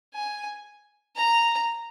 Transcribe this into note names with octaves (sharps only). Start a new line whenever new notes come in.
G#5
A#5